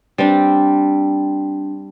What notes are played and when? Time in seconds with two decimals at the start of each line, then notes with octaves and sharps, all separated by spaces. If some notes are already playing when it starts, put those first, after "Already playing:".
0.18 G3 C4 D4